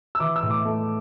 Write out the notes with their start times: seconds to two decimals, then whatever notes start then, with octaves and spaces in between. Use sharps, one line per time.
0.15 E6
0.20 E3 D6
0.36 E6
0.43 A2
0.51 D6
0.65 A3